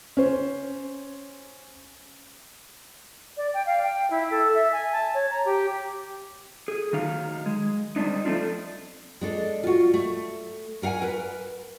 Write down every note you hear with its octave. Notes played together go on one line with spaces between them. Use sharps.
C#4 C5
D5
G5
F5
G5
E4
A4
E5
G#5
A5
C#5
A#5
G4
G#4
D#3 F#3 D#4 F5
G#3
G3 C4 D4 D#4
F3 A3 C4 D4 F4
G#3 D4 A4
F4 F#4
A3
B3 A#4 F5 F#5 G#5
A#4 B4